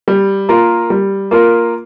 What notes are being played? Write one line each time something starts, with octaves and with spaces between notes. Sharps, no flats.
G3
A#3 F4 A#4
G3
A#3 F4 A#4